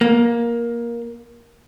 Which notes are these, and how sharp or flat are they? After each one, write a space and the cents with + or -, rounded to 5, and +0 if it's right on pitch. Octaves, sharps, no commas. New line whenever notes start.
A#3 +15